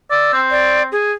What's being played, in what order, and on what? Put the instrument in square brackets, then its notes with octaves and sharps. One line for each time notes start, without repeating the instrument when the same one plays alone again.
[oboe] D5 [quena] E6
[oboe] C4
[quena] D5
G#4